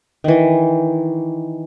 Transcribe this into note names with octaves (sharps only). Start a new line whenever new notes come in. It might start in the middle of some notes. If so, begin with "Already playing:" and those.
D#3 E3